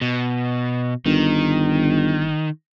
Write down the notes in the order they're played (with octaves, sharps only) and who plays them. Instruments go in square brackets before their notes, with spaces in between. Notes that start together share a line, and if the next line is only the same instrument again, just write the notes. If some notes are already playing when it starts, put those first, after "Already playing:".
[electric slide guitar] B2
[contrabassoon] G1 [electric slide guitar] D#3